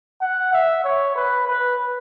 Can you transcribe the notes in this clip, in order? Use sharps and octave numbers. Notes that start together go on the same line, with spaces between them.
F#5
E5
C#5
B4
B4